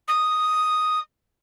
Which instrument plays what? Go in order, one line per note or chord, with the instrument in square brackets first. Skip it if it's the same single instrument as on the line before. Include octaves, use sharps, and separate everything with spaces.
[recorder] D#6